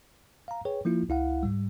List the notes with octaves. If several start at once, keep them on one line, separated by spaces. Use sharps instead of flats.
F5 A#5
G#4 B4 C#5 G5
F3 A#3 E4 F4
C#2 E4 F5 F#5
G#2 G3